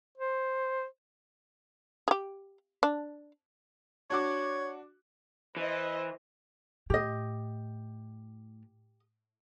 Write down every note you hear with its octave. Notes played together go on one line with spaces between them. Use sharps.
C5
G4 G#4
D4
D4 F#4 C#5 D6
E3 C5 D#5
A2 G4 D#5